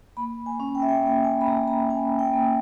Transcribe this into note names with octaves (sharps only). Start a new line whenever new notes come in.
A#3 B5
G#5
C#4
G5
E5
G5
A#3 G5
G#5
B5
A#3 A#5
A#5
C#4 G#5
G5
A#3